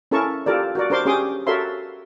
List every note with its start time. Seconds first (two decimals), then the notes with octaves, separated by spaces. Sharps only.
0.11 C#4 E4 A4 A#4 A5 C#6
0.46 F4 G4 A4 A#4 D5
0.75 F#4 A#4 D5
0.90 D4 A#4 C5 C6 D6
1.05 C#4 G4 G#4 C6 D6 D#6
1.47 F#4 A4 A#4 C#5 E5 C6